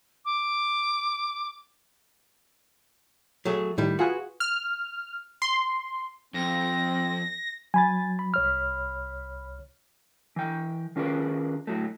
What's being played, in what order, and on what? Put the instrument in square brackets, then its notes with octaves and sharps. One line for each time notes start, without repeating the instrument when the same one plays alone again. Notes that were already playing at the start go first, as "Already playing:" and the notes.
[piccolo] D6
[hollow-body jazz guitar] F#3 A3 G#4
[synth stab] A2 D#3 [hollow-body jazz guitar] G3 E4
[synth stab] F4 G#4 B4 [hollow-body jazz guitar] F#4
[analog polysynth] F6
C6
[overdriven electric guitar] F2 [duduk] C4 [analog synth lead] A#6
[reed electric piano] F#3 [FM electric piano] G#5 B5 A6
[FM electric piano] B5
[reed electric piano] C2 C#5 F6
[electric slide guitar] E3 G5
D#3 C#4 F4 G#4 A#4 B4
A2 F#3 A3